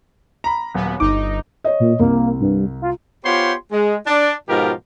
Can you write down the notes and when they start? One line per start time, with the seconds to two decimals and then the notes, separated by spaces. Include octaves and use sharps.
0.44 A#5 B5
0.74 D#1 F#3 B3
1.00 G1 D#4 D6
1.64 C#5 D#5
1.80 A#2
2.00 C2 A#3
2.40 G2
2.82 F4
3.24 B3 F4 G4 C5 C#5 C6
3.72 G#3
4.06 D4
4.49 G#2 B2 F3 F4 G4 A#4